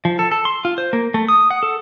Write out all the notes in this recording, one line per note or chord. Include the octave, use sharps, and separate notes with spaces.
F3
A4
A4
C6
F4
C5
A#3
A3
D#6
F#5
A4